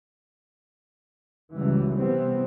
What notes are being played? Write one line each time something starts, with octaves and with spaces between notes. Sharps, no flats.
C#2 E3 F#3 G3
C3 E3 G3 B3 C4